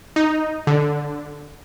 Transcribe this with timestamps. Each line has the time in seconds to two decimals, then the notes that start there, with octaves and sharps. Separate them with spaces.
0.16 D#4
0.67 D3